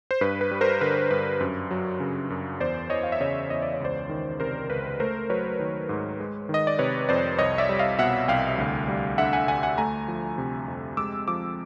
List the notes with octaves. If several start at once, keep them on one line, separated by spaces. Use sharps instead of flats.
C5
G2 B4
B4
G3
A#4 C5
D3 B4
G2 B4
F#2
F#3
C#3
F#2
E2 C5 D5
E3 C#5 D#5
F5
E5
C#3 C#5 D#5
E2 D#5
D5
C#5
C#2 C5 D5
D#3
C3 A#4 C5
C#2 B4
A3 A#4 C5
F#3 B4 C#5
D#3
G#2
G#3
D#3
D#5
D5
C3 B4 C#5
F2 C5 D5
C2 C#5 D#5
D5 E5
G3
D#5 F5
B2 E5 F#5
C2 F5 G5
D2
G3
D3 E5 F#5
F#5 G#5
D2 F#5 G#5
F#5 G#5
A3 G#5 A#5
F3
C3
F2
G#3 D6 E6
F3 D6 E6